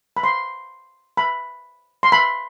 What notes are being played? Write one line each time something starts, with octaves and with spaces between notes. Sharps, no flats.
B5
C6
B5
C6
B5